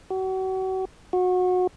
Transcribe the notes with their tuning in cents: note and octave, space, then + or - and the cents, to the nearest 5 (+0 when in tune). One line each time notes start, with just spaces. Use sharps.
F#4 +35
F#4 -25